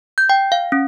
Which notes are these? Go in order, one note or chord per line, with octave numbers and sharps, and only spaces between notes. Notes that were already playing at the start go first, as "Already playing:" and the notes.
G6
G5
F5
C#4